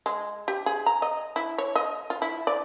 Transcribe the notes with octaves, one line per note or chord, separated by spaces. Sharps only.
G#3
G4
G#4
A#5
D#5
E4
C#5
D#5
F4
E4
D5